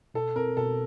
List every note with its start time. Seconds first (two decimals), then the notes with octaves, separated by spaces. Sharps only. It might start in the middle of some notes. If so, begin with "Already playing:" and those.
0.14 B2 A4
0.36 C4 A#4
0.57 B2 A4